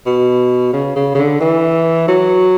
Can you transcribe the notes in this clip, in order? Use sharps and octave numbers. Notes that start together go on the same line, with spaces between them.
B2
C#3
C#3
C#3
D3
E3
F#3